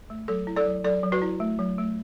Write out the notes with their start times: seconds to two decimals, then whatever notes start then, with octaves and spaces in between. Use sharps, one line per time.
0.10 A3
0.28 F#3 A4
0.47 E4
0.56 A4 D5
0.66 F#3
0.84 F#3 A4 D5
1.03 F#3
1.12 F#4 B4
1.22 E4
1.40 A3
1.59 F#3
1.78 A3